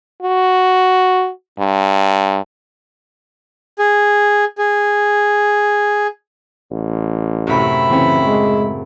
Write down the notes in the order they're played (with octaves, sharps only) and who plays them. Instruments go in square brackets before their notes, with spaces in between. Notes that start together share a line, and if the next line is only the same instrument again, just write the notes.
[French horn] F#4
G2
[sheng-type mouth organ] G#4
G#4
[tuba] A1
[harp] F#2 A2 C3 [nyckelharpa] E4 B5
[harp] C#3 C4 C#4 [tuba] E3
[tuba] G#3